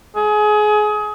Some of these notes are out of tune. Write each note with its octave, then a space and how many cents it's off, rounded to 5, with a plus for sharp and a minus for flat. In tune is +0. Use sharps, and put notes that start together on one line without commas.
G#4 +25